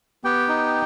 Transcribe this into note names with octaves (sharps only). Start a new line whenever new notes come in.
B3 G4 G5
D#4